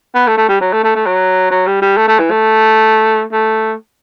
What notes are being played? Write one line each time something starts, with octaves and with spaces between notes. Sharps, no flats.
B3
A3
A3
G3
F#3
A3
A3
A3
F#3
F#3
G3
G3
A3
A3
E3
A3
A3